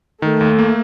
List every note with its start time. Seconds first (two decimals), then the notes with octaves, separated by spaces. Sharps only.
0.22 D#3 A3
0.41 D#2
0.59 A#3